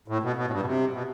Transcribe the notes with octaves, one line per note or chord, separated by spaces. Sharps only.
A2
B2
B2
A2
G2
B2
C3
B2